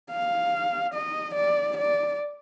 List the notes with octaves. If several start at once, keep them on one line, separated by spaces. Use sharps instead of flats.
F5
D#5
D5
D5